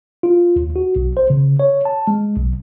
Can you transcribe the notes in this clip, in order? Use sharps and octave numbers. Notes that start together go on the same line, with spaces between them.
F4
D#2
F#4
B1
C5
C#3
C#5
A5
G#3
B1